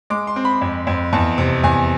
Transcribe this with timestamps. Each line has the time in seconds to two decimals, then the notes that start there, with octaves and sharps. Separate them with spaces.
0.10 G#3 D6
0.27 C6
0.36 C4
0.45 B5
0.61 F2
0.87 F2
1.13 E2 A5
1.38 C3
1.64 E2 G#5